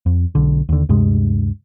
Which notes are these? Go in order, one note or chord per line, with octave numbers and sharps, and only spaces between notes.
F2
B1 D3
D#2 D3
D2 G2 C3 G#3